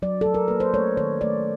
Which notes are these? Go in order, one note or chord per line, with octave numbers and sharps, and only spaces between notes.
F#3 D5
F#3 A4
A#4
A#3 B4
C5
A3 C#5
D#3 C#5
A3 D5